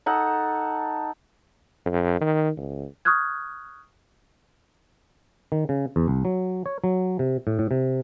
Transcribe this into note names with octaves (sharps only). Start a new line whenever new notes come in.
D#4 A4 F#5
F2
D#3
C#2
C#6 D#6 F6 F#6 G#6
D#3
C#3
E2
C2
F#3
C#5
F#3
C3
A2
A2
C3